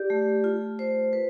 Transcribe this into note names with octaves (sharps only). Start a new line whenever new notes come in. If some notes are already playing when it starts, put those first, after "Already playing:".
Already playing: G4 D5
A3
F4
C5
B4